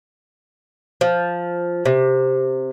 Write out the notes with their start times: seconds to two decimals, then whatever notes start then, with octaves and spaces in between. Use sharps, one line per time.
1.01 F3
1.85 C3